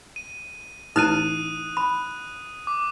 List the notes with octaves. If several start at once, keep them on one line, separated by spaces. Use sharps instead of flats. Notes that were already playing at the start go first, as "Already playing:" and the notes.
D#7
A1 D#4 E4 D#6 F6 F#6 D#7 E7
B5
D6